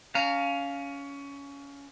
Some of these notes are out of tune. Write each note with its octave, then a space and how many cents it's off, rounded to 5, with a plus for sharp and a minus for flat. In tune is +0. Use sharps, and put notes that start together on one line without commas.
C#4 +20 F5 +0 A#5 -20